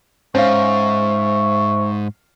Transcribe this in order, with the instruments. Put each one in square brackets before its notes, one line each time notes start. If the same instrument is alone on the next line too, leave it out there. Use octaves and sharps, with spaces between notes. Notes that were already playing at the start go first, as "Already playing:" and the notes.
[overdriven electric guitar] G#2 [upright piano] C#4 F5 [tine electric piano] C5 [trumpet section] E5 C#6